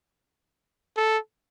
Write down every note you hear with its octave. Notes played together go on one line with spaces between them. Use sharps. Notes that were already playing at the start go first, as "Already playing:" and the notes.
A4